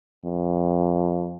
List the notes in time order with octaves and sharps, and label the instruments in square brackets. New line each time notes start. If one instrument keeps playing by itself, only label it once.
[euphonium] F2